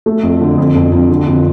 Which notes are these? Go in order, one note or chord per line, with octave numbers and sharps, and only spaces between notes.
A3
F2
D3
F2
F2
F2
D3
F2